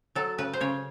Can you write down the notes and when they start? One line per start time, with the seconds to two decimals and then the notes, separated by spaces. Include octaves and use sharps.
0.15 F#3 A4
0.38 C#3 B4
0.53 C5
0.61 C#3 C#5